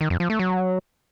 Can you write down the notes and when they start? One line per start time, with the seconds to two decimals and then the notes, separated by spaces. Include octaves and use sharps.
0.01 D#3
0.10 F2
0.20 F3
0.30 A3
0.39 F#3